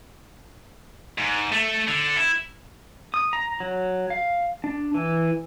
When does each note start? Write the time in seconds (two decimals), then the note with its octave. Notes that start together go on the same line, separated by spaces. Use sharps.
1.18 G#2
1.52 A3
1.88 D3
2.16 E4
3.14 D#6
3.33 A#5
3.60 F#3
4.10 F5
4.64 D4
4.94 E3